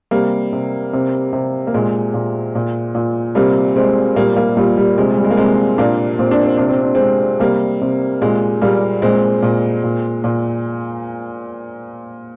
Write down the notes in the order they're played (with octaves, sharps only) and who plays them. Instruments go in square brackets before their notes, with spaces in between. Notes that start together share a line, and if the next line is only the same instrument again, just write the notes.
[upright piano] C3 G3 A#3
C3
C3
C3
A#3
A#2 G#3
A#2
A#2
A#2
C3 G3 A#3
C3 G#3 C4
A#2 G3 A#3
G3 A#3
A#2 G3
G3
C3 G#3
G3
G#3
A#3
C3 G#3 C4
A#2 A#3 D4
A#2 C4
D4
C4
C3 D4
C4
D4
G#3 C4
C3
C3 G3 A#3
C3
A#2 G#3
A#2 G3 A#3
A#2 G#3 C4
A#2
A#2
A#2